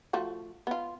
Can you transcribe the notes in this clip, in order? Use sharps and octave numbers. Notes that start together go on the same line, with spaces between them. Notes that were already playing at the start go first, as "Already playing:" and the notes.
F3 A3 F#4
B3 F4